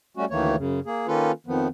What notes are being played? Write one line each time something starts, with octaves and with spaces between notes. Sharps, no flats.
G3 A3 C#4 F#4
D2 D#3 E3 A3 A#3 C#5
F#2 C#3
A#3 G#4
D#3 A#3 C#4 F4 A4 B4
F2 D#3 F3 B3